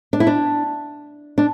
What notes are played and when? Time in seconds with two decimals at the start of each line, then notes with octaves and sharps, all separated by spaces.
0.13 D4
0.20 E4
0.27 D4
1.38 D4